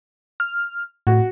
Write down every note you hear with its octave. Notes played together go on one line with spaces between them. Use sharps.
F6
A2 F#4